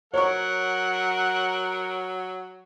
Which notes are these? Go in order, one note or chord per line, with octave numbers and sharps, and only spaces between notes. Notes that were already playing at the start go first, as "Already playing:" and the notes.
F#3 A#4 C#5 F#5 C#6